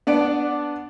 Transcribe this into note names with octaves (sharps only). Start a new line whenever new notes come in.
B3 D4 D5 F#5 D7